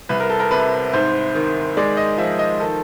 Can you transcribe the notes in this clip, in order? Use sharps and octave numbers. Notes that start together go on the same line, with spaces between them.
C2 B4
A#4
A4
A#4
C3 B4
G#2 C5
D#3
G#3 D5
D#5
F3 E5
D#5
D#3 A4